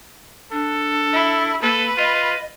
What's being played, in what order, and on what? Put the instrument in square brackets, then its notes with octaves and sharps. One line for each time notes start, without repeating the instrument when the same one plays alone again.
[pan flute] D4 [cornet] A4
[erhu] E4
[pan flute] A#3 [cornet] A4 [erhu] B4
[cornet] F4 [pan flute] D#5